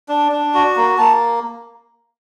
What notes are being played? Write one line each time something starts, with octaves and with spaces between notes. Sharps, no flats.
D4
D4
F#4
A#3
A#3 A5